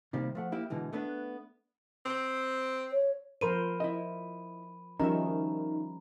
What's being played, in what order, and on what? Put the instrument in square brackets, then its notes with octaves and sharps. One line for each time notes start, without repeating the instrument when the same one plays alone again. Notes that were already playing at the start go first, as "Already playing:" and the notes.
[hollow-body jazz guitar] C3 D#3 G3 A#3
F3 A3 F#5
A#3 E4 G4
B2 D3 E3 G#3
A3 B3 D4 B4
[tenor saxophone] C4
[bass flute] C#5
[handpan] F3 A#4 C5 [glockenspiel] B5 D#7
[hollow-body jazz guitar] E4 D#5
[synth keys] D#3 [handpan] F3 G3 C#4 [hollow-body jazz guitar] D#4 F#4 E5 [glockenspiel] A#5